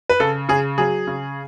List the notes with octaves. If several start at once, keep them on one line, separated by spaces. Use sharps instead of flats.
B4
C#3 A4
C#3 G#4
F#3 G#4
C#3